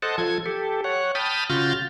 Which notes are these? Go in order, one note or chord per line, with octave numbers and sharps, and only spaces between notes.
A4 C5 D#5 F#5 A5
F3 A4 G#6
G4 A4
C#5 F#5
G5 A5 B5 D#6 F6
C#3 F4 F#4 F6 G6 A6